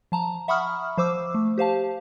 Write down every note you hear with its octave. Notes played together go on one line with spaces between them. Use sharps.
F3 A5 A#5
E5 F#5 B5 C#6 D#6 F6
F3 C5 D6 E6
A3
G4 C5 F5 A5